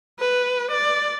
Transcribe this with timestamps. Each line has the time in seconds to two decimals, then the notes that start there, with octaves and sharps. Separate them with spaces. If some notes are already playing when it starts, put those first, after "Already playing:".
0.20 B4
0.72 D5